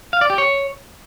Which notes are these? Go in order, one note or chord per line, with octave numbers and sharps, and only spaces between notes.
F5
D5
G4
C#5